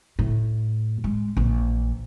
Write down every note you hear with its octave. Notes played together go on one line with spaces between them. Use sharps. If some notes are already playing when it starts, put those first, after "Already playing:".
A2
G#3
A#1 E3